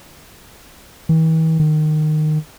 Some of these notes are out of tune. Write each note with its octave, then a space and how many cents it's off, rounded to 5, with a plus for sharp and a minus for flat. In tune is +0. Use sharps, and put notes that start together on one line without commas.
E3 -45
D#3 -20